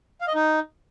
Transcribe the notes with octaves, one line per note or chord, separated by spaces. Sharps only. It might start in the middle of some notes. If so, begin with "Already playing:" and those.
F5
D#5
D#4